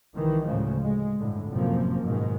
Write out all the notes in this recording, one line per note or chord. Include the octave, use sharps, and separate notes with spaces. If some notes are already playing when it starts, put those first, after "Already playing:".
C2 D#3 E3
D2 A2 C#3 F3 G#3
G#3
G1 A2 D3
F1 F#2 A2 C3 F3 A#3
G#2 B2 D#3 G#3